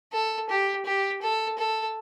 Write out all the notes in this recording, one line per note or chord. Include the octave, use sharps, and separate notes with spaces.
A4
G4
G4
A4
A4